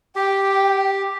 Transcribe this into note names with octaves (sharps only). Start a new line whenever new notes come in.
G4 G5